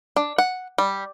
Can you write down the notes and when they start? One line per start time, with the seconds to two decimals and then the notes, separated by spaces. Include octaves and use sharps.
0.16 D4
0.38 F#5
0.78 G3